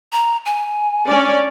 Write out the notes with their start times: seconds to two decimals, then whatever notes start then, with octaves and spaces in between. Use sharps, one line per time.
0.12 A#5
0.46 G#5
1.06 C#4 D4 D5